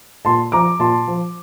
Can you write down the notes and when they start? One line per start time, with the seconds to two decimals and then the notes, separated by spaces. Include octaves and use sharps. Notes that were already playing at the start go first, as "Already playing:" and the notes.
0.25 A#2 A5 C6
0.52 F3 A#5 D6
0.79 A#2 A5 C6
1.08 F3